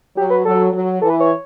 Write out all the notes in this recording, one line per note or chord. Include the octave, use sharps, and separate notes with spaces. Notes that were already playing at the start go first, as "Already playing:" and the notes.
F#3 G4
B4
F#3 A4
F#3
E3 A4
B4
C#5